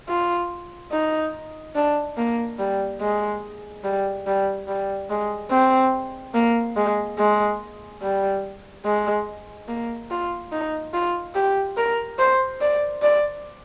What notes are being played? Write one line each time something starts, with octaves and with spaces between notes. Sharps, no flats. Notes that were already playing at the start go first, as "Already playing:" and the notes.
F4
D#4
D4
A#3
G3
G#3
G3
G3
G3
G#3
C4
A#3
G#3
G#3
G3
G#3
A#3
F4
D#4
F4
G4
A#4
C5
D5
D5